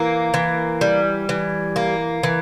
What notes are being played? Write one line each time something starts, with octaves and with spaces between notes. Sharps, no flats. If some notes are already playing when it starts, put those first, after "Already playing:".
Already playing: E3 A#3
E3
G3
E3
A#3
E3